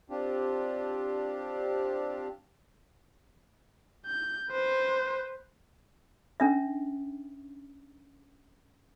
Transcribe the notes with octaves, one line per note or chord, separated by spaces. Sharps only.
C4 D4 F4 G4
G6
B4 C5
C#4 D4 E5